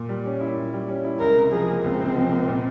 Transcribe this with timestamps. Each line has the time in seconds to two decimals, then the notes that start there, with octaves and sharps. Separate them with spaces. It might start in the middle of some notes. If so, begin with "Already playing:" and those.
Already playing: A#2
0.09 G3
0.26 C#4
0.41 E4
0.57 A#2
0.73 G3
0.88 C#4
1.05 E4
1.20 C#2 A#4
1.37 C3
1.52 F3 G#4
1.68 A#3
1.84 C#2 C4
2.00 C3
2.16 F3
2.31 A#3
2.48 A#2